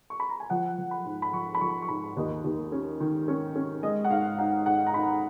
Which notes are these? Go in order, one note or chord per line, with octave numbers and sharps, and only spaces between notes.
C#6
B5
A#5
G#5
F3 F#5
F3
B5
G#2
B5
F3 C#6
B5
F3 C#6
C#6
G#2 B5
D#2 D#5
D#2
C#4
D#3
C#4
C#4
G#3 D#5
F#5
G#2 F5
D#4 F#5
G#2 F#5
A#5
D#4 B5